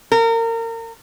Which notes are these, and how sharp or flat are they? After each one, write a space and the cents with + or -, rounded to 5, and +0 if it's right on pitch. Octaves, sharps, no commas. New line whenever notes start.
A#4 -30